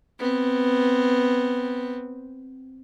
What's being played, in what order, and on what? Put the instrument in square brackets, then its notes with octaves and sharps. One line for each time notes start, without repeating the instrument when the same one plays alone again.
[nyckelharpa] B3 C4